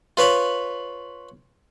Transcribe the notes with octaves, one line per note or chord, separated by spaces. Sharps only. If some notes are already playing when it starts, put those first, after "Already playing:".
F4 B4 C#5 B5